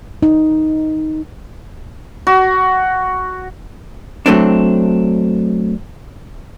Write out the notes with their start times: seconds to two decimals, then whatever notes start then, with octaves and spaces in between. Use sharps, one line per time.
0.23 D#4
2.27 F#4
4.26 F#3 A3 C4 D4